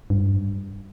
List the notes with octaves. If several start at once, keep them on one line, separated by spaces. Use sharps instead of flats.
G2